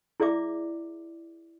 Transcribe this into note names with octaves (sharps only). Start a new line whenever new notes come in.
E4 G#4 D5 E5 D6